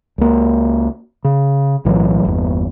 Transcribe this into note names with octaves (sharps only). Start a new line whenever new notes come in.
C#2 A#3
C#3
B1 A2 E3 F#3
G1 E2